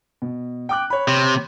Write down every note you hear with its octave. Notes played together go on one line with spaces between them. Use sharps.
B2
G5 D6 F#6
C#5 B5
C3